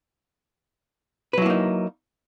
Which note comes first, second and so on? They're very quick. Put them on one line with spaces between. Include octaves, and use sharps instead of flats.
B4 F#3 E4 A#3 D#4